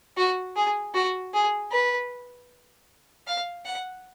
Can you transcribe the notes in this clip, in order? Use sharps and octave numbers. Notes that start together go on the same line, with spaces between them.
F#4
G#4
F#4
G#4
B4
F5
F#5